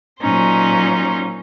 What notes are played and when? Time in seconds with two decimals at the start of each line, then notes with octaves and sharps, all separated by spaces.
0.21 A#2 F#3 C#4 D#4 C5